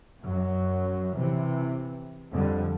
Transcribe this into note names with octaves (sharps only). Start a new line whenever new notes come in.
F#2 F#3
C3 E3
F2 D3 G3